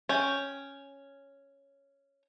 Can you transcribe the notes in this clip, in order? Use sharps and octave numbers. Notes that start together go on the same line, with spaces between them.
C#4 G5